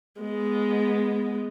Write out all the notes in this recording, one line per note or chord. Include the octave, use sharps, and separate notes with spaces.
G#3 B3